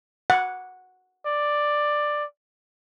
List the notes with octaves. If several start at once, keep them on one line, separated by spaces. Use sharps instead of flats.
F#5
D5